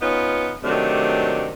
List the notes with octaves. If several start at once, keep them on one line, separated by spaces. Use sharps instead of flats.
B3 C#4 D#4 F4 B4
C3 D#3 F#3 A3 D4